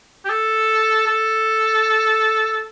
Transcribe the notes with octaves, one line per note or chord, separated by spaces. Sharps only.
G4
A4
A4